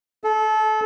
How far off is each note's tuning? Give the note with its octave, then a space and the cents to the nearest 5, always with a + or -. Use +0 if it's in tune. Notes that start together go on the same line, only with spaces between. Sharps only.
A4 -25